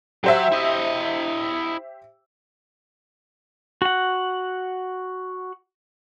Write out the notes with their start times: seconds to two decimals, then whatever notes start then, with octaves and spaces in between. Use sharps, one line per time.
0.24 F#3 G4 C5 E5
0.52 E4 D#5
3.82 F#4 F#5